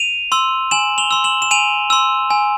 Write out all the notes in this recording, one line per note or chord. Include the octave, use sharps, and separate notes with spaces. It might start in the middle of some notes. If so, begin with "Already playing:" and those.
Already playing: D#7 F7
C6 E6
G#5 E7 F#7
F7 G7
C6 E6
E7 F#7
E7
G#5 D#7 F7
C6 E6
G#5